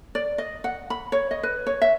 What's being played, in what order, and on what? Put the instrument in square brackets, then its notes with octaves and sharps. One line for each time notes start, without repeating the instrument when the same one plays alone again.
[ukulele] D5
D#5
F#5
B5
C#5
D#5
B4
C#5
E5